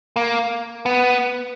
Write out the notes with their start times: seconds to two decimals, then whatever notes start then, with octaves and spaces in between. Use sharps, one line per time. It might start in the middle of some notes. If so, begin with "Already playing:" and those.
0.16 A#3
0.86 B3